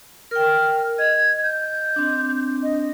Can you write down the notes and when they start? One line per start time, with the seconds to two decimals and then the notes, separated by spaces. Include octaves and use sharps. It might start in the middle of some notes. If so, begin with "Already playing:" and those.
0.31 A#4 G5 F6
0.98 D#5 G#6
1.43 G6
1.96 C4 D4
2.62 D#5